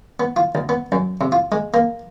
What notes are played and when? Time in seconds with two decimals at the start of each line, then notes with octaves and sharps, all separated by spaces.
0.20 B3
0.36 F4
0.55 D2
0.69 B3
0.92 F#2
1.21 C3
1.32 F4
1.52 G#3
1.74 A#3